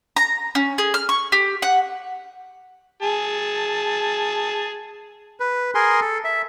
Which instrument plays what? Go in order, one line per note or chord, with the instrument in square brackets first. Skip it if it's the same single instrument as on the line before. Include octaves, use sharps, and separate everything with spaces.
[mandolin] A#5
C#4
G#4
F6
C#6
G4
F#5
[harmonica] G#4 A5
[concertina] B4
G#4 A#4 G#5 C6
A4
E5